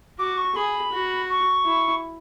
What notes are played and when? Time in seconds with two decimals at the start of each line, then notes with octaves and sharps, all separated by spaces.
0.18 F#4 D6
0.37 C#6
0.55 G#4 B5
0.92 F#4
1.29 C#6
1.65 E4